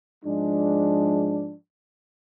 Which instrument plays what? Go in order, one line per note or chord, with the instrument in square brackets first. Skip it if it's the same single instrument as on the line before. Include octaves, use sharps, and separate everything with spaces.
[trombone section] G#2 F3 G#3 D4